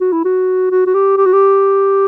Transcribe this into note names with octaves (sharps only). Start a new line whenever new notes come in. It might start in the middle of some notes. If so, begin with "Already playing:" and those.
F#4
E4
F#4
F#4
F#4
G4
G4
F#4
G4